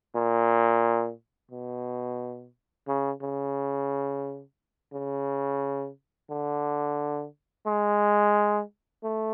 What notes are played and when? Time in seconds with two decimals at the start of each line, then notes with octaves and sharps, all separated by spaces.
0.16 A#2
1.51 B2
2.88 C#3
3.22 C#3
4.93 C#3
6.30 D3
7.66 G#3
9.03 A3